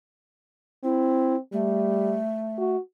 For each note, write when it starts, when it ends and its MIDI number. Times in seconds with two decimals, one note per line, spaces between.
0.84 1.38 60
0.84 1.36 64
1.53 2.19 55
1.53 2.76 57
2.58 2.79 66